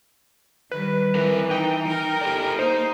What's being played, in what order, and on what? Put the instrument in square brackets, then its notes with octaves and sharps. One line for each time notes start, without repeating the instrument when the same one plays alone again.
[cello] D#3 G3 [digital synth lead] B4
[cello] E3 [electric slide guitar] C4 A#4
[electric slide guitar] D#4 [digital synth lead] G5
[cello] A#4
[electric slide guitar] G4 A4 D5
[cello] A#3 [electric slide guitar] D#4 A#5 [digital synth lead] C5